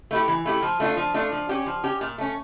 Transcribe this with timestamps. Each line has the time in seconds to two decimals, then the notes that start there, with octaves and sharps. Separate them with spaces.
0.11 A3 E4 G4
0.28 E3
0.46 A3 E4 G4
0.63 F3
0.80 A3 D4 F4
0.97 F3
1.14 A3 D4 F4
1.32 F3
1.49 C#4 G4
1.66 F3
1.84 C#4 G4
2.01 A#2
2.18 A3 C#4